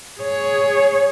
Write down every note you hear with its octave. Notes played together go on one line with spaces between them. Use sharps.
G#4 C#5